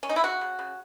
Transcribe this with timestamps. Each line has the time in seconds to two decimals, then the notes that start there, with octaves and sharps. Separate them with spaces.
0.03 C#4
0.09 D#4
0.16 E4
0.24 C#3 F#4
0.41 C#3
0.59 C#3